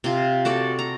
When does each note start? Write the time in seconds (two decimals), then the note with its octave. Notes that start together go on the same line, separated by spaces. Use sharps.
0.04 C3 F4
0.45 F#4 A4 D5
0.79 A#5